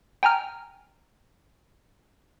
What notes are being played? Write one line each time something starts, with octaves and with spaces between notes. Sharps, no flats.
G5 G#5 A#5 F6